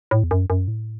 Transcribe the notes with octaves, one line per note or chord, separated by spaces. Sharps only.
A2
E2
F#2
F#2
A2